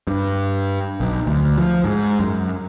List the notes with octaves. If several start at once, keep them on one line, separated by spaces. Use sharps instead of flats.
G2
B1
D2
F3
G#2
F#2